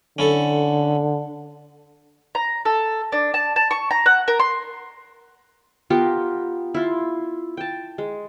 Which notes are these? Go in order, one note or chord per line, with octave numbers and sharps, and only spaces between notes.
D3 C#4 E4 A4
A#5
A4
D4
A5
A5
C#6
A#5
F#5
A#4
C6
B3 F4 G4 A#4
E4 F4
G5 A5
G#3